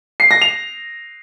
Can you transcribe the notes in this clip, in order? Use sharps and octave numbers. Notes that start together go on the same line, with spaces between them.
C7
A#6
F7